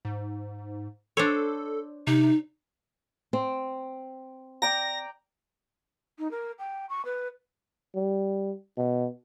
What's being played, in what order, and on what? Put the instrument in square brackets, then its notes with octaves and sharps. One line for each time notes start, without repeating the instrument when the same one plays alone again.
[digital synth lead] G#2
[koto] D4 C5 C#5 [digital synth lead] A4
[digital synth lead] C3 [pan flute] D#4
[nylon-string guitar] C4
[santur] D5 G5 A#5 [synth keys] A#6
[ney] D#4
A#4
G5
C#6
B4
[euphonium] G3
B2